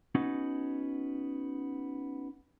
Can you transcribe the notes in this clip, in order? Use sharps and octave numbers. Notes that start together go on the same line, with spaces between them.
B3 C#4 D#4 F#4